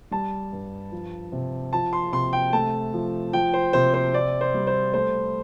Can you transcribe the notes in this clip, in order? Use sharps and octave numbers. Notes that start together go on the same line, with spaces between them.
G3 A5
G2
F3
C3
F3 A5
C6
C3 C6
G5
A3 A5
F3
F3 G5
C5
C3 C5
C5
C4 D5
C5
G3
C5
A3 C5